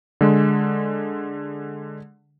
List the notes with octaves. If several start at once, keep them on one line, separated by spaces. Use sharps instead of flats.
D3 G#3